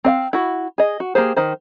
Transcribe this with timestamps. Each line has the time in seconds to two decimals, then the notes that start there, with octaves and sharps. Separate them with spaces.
0.04 C4 D#5 F5
0.33 E4 F#4
0.78 G#4 D#5
1.00 F#4
1.15 A#3 G4 G#4 C5
1.36 D#3 C5